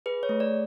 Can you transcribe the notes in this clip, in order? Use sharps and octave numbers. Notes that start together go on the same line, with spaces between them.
G#4 B4
C#5
A3
D5